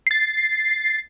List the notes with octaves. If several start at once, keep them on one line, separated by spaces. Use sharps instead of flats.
A6 C7